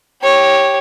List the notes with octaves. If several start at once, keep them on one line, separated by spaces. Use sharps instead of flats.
G4 C#5